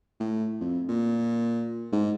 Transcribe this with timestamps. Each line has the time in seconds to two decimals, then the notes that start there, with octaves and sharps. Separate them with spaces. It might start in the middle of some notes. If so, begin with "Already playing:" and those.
0.20 A2
0.61 F2
0.89 A#2
1.92 G#2